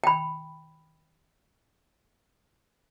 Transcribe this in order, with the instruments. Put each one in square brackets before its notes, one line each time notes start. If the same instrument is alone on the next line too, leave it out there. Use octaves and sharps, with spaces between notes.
[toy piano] G5 B5